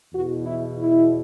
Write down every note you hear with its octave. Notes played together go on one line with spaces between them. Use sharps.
E2 B2 F#4
E4
E4